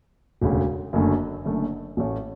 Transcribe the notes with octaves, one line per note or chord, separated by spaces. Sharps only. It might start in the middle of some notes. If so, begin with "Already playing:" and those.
E1 D2 C#3
F#1 F#2 D3 A3
F#1 F#2 D3 A3
A1 A2 E3 A3 C#4